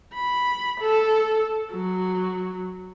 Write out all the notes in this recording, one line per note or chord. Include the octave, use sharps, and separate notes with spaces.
B5
A4
F#3